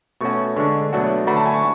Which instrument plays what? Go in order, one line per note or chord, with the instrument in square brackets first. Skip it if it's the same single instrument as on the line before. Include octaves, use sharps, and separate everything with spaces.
[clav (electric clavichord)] B2 A3 C#4 F#4 [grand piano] C#6
[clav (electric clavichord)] D3 G#3 D4 [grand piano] C#6
[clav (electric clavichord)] B2 F#3 A3 D4 F#4
[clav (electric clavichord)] D3 A3 D4 F#4 [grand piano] B5
[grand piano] A5
G#5
C#6